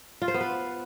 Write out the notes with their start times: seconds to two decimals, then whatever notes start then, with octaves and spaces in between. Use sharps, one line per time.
0.22 F4
0.28 C5
0.34 B3
0.41 B4